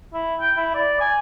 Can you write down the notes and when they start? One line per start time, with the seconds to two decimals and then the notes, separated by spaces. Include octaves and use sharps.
0.13 E4
0.40 G5
0.57 E4
0.74 D5
1.00 G#5